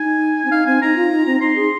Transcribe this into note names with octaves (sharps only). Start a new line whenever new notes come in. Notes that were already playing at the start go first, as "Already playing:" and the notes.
Already playing: D#4 G#5
C4
D#4 F5
C4 G#5
D#4 A#5
F4
D#4
C4
D#4 C6
G#4